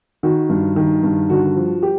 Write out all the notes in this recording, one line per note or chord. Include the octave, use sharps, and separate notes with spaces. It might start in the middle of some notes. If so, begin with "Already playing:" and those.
D#3 F#4
G2
D#3
G2
D3 F#4
F3
G4